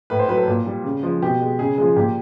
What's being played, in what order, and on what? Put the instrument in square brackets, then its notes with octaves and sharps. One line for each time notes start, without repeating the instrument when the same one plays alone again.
[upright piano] A2 B4
C5
F#3 B4
A4
A#2
G3
C#3
F3 G#3
B2 G4
G#3
C#3 G#4
F3 G#3 G#4
A#2 G4